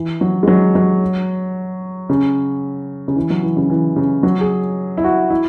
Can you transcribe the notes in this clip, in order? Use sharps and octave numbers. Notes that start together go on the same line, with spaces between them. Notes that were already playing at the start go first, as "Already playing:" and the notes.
Already playing: E3
F#3
G#3
F#3
F#3
C#3
C#3
E3
F#3
E3
C#3
E3
C#3
F#3
G#4
E4
F#4
E4